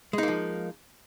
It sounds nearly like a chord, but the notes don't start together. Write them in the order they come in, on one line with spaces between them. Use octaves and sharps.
G#3 D#4 A#3 F3